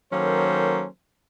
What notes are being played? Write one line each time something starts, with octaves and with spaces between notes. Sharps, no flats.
D#3 F#3 A#3 C#4 A4 C5